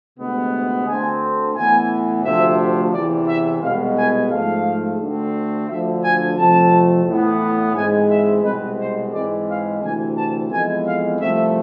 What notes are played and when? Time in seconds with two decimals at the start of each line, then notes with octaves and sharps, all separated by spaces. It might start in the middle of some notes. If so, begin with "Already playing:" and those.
0.18 D2 C3 G#3 B3
0.86 D2 D3 A3 C4 G#5
1.54 A2 E3 B3 G#5
2.23 D2 C3 F3 A3 E5
2.92 E2 C3 E3 D5
3.27 E5
3.61 C2 B2 G#3 B3 F5
3.96 G#5
4.30 G#2 F3 A3 F5
4.99 D2 D3 A3 C4
5.68 D2 D3 F3 E5
6.02 G#5
6.37 F2 C3 F3 A3 C4 A5
7.06 A2 E3 B3
7.75 G#2 E3 G#3 C4 G#5
8.10 E5
8.43 C2 B2 G#3 C4 B4
8.78 C5
9.12 G#2 E3 G#3 C4 D5
9.47 F5
9.82 D2 C3 E3 G#5
10.16 A5
10.50 F2 E3 G#3 B3 G#5
10.85 F5
11.20 C2 C3 F3 A3 C4 E5